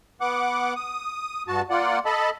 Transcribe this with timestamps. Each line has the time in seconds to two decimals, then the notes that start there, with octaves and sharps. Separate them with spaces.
0.21 B3 F#5 D6
0.76 D#6
1.48 G2 F#4 A5
1.70 A#3 F4 D5 F#5
2.06 A4 D#5 A5 B5